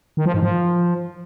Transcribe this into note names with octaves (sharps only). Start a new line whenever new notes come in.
D#3
F3
G#2
F3